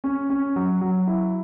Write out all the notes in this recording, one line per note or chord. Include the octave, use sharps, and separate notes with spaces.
C#4
C#4
F#3
F#3
E4